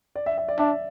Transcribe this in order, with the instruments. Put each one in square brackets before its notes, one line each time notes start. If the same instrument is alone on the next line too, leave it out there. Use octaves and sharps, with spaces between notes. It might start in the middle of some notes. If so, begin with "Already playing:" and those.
[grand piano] D5
E5
E5
D5
[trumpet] D4 [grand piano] E5